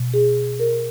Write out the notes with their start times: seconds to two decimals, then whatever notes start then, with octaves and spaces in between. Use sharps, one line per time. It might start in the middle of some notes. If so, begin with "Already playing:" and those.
Already playing: B2
0.14 G#4
0.60 A#4